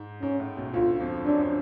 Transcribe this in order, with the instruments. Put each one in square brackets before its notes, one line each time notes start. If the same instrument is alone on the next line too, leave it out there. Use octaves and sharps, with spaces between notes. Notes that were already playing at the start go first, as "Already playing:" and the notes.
Already playing: [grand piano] G#2
[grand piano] G#2 [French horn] C#4
[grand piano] A2
B1 B2
[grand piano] D2 D3 [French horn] F4
[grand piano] F2 F3
[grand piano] F#2 F#3 [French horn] D4
[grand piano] F3